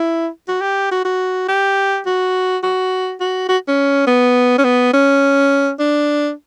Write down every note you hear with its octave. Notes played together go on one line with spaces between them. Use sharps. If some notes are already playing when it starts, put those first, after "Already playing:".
Already playing: E4
F#4
G4
F#4
F#4
G4
F#4
F#4
F#4
F#4
C#4
B3
C#4
B3
C#4
D4